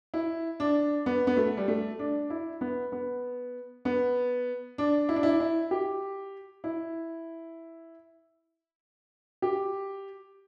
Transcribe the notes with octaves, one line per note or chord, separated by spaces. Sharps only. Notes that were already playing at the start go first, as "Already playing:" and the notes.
E4
D4
B3
B3
A3
G3
A3
D4
E4
B3
B3
B3
D4
E4
D4
E4
E4
G4
E4
G4